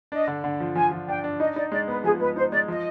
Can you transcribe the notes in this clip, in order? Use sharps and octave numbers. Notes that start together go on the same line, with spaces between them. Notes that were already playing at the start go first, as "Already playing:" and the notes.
D4 D#5
D3
D3
F3
F3 G#5
F3
D4 G5
D4
D#4 D#5
D#4 D5
G#3 D5
B3 B4
F3 G#4
G#3 B4
D#4 C5
G#3 D5
F3 D#5